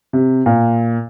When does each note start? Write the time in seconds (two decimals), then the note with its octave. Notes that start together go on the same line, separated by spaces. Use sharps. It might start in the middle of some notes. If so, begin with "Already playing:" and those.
0.13 C3
0.46 A#2